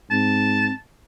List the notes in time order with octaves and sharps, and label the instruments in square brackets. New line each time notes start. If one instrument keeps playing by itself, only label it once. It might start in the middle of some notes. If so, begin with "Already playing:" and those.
[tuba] G#2 [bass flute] C4 [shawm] A5